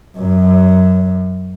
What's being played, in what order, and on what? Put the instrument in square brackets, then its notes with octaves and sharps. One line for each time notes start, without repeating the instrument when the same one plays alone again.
[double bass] F#2